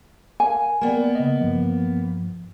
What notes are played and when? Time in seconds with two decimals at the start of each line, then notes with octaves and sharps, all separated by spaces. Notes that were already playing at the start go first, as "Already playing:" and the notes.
0.40 A#4 F5 G#5
0.81 A#3 B3 D5 G5 B5
1.15 C#3 D#5
1.41 G2 F3